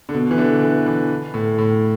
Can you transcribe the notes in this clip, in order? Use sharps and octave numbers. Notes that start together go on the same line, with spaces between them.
D3
B2
E3
D3
E3
E3
A2
A2